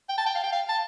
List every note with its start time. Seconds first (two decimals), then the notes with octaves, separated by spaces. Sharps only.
0.09 G5
0.18 A5
0.26 G5
0.35 F5
0.44 G5
0.53 F5
0.69 A5